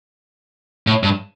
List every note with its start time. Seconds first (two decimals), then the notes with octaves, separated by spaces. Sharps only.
0.87 A2
1.03 G2